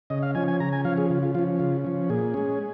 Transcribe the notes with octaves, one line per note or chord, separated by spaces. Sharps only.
C#3 D#5
F5
F3 C#4 G#5
G#5
C#3 A#5
G#5
F3 C#4 F5
G#4
C#3 F4
F4
F3 C#4 F4
C#3 F4
F3 C#4
A#2 G#4
G#3 C#4